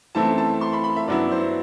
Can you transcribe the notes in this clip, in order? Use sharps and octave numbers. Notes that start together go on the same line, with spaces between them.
F#2 E3 A3 C4 E4 A5
A5
C6
B5
B5
E5
G2 F#3 B3 E4 D5
C5